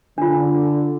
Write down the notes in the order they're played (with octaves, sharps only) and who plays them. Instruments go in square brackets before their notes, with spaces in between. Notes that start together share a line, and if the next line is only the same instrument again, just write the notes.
[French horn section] D3 [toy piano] D4 F4